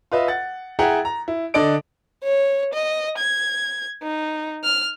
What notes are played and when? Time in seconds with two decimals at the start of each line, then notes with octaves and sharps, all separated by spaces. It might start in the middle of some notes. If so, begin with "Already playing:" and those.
0.12 F4 B4 D#5 E5
0.28 F#5 A6
0.79 E4 G#4 E5 F#5 G5 A#5
1.05 A#5
1.28 E4
1.54 D3 D4 D5 D#5 D7
2.23 C#5
2.73 D#5
3.18 G#6
4.02 D#4
4.64 F6